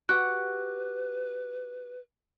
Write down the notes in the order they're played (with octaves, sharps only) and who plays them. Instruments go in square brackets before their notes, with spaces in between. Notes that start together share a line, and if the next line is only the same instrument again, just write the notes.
[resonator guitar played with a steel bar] F#4 G4 F#5 [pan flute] B4 [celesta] F#6